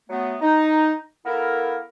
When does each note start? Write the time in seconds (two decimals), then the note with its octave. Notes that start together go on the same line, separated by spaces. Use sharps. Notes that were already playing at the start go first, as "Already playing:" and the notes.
0.09 F#3 A3 B3
0.41 D#4
1.25 A#3 B3 E4 A4 A#4